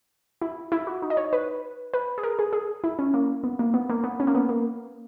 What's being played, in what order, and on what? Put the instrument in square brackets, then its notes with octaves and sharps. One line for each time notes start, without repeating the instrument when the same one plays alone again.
[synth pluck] E4
E4
F#4
D#4
D#5
C#5
B4
B4
G#4
A#4
G#4
G#4
E4
C#4
A#3
B3
A#3
B3
A#3
B3
C#4
A#3
B3
A#3